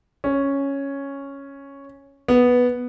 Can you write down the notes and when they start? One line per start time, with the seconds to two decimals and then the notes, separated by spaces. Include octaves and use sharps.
0.24 C#4
2.28 B3